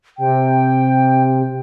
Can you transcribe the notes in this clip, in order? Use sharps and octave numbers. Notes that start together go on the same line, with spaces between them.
C3 G5